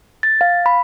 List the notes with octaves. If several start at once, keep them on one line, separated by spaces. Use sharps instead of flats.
A6
F5
B5